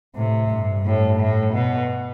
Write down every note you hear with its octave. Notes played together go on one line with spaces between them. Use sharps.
A2 C3
G2
A2
A2
B2